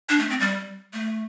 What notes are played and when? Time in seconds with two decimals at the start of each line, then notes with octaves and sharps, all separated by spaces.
0.09 D4
0.19 A3
0.30 C4
0.40 G3
0.93 A3